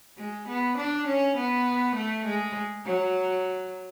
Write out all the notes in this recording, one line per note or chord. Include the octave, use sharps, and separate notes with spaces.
G#3
B3
D4
C#4
B3
A3
G#3
F#3